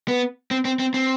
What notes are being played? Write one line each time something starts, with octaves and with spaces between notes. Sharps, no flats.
B3
C4
C4
C4
C4